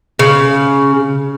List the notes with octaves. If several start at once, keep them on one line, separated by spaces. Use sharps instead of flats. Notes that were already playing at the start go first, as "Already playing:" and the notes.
C#3